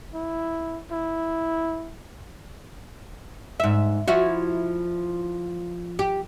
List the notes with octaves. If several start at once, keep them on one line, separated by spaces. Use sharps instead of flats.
E4
E4
G#2 E5
F3 E4 F#4
G4